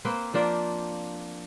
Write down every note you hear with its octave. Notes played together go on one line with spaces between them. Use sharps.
A#3 C4 B4 C5
F3 A#3 D4 F4